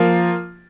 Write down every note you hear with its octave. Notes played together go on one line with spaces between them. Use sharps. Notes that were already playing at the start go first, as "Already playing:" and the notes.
Already playing: F3 A#3 F4